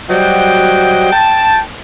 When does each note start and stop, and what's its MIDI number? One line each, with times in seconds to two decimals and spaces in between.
0.10 1.10 54
0.10 1.10 55
0.10 1.10 66
0.10 1.10 72
0.10 1.10 75
0.10 1.10 79
1.13 1.60 79
1.13 1.60 81